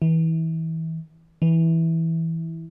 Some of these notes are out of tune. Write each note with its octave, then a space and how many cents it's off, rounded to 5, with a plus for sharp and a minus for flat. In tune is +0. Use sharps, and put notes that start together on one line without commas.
E3 -30
E3 -10